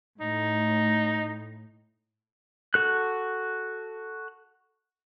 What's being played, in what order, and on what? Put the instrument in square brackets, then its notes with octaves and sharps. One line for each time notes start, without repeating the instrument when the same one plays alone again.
[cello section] A2 [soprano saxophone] D#4
[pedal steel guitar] F#4 A4 F#6